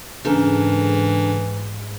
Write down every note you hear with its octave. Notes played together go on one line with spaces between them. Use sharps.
G#2 C#3 E3 D4 A4 A#4